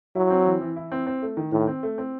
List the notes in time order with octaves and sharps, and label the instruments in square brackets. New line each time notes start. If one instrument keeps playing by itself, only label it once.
[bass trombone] F#3 [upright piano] E4
[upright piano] C4
E3
E3
E4
C4
C4
A3
D#3
[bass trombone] A2 [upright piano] D#3
[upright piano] C4
A3
C4